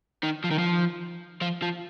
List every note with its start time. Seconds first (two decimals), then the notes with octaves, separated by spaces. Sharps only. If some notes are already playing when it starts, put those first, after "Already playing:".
0.23 D#3
0.44 F3
0.51 D#3
0.59 F3
1.41 F3
1.62 F3